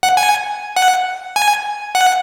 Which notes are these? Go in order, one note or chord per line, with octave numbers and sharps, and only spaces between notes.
F#5
G#5
F#5
G#5
F#5